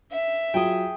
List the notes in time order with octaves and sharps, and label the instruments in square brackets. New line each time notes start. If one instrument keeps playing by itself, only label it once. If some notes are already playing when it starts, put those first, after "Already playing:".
[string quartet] E5
[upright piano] F#3 F4 [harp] G#4 G5